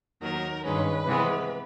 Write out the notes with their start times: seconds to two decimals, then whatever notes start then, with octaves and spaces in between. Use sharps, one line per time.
0.21 D#2 D#3 F#3 A#4
0.64 G2 D#3 G#3 C#4 B4
1.06 C3 E3 G#3 B3